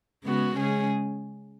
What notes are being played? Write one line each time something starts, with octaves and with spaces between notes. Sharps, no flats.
C#3 G#3 B3 F#4
C#3 G#3 C#4 G#4